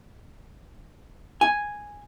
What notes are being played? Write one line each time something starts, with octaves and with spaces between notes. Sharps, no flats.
G#5